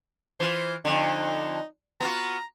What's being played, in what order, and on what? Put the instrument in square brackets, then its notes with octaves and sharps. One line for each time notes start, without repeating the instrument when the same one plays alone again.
[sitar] E3 F4 [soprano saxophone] C5
[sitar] F2 D3 [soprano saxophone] D#4
[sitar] B3 F4 F#4 [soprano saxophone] A#5